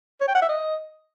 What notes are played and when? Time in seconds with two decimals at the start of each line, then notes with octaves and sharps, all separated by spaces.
0.21 C#5
0.28 G5
0.35 F#5
0.42 E5
0.49 D#5